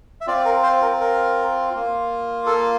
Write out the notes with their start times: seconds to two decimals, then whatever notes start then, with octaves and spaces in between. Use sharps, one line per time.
0.21 E5
0.27 C4 F4 D5
0.45 A#4
0.63 C5
0.82 A#4
1.00 A#4
1.73 A#3 F4
2.46 A4